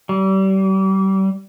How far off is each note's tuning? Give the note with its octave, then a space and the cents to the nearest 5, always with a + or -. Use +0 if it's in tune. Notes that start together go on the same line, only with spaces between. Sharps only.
G3 -30